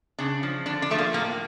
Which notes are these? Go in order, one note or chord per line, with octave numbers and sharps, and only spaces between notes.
C#3 D4
F3
D3 D4
D4
F3 A3
A#3
A2 A#3